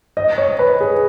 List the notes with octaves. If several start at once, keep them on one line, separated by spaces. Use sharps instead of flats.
D#5
C#5
B4
G#4